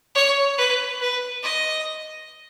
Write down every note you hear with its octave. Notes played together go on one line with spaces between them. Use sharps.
C#5
B4
B4
D#5